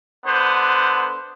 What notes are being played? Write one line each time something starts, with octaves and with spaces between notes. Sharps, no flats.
D3 B3 C5